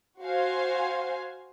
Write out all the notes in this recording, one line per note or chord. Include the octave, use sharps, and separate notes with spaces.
F#4 C5 F5 G#5